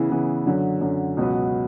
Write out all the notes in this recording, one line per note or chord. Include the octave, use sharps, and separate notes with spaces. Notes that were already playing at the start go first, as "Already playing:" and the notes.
Already playing: C#3 E3 B3 E4
C#3 E3 B3 E4
F#2 D3 F#3
F#2 D3 F#3
C#2 B2 F#3 B3